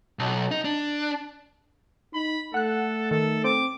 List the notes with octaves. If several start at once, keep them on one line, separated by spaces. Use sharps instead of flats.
B1
D#4
D4
D#4 B5
A3 A4 F#5 F#6
D#3 A4
C4 D6